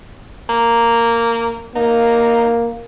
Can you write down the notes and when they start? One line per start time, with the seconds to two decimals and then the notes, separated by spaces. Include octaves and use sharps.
0.49 A#3
1.75 A#3 D#4